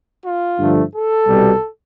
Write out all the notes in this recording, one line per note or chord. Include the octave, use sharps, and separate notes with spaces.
F4
G2 D3 F3 A3
A4
C2 B2 G3